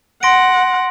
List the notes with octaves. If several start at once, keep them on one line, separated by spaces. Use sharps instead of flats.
F#5 C6 A#6 D7